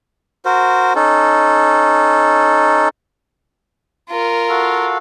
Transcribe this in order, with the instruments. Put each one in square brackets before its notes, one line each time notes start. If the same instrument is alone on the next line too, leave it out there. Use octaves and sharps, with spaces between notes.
[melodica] F#4 A#4 C5
C#4 D#4 A4
[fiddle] F4 A#4
[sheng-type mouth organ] F#4 A4 F5